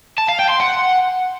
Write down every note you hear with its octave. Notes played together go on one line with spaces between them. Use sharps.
A5
F5
G5
C6
F#5